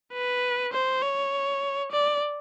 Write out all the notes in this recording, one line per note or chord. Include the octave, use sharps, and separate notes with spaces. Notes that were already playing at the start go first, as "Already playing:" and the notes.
B4
C5
C#5
D5